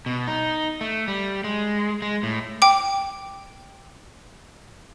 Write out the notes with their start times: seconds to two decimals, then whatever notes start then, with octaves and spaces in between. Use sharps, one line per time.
0.06 B2
0.27 D#4
0.81 A3
1.08 G3
1.44 G#3
2.02 G#3
2.23 A2
2.62 G5 D6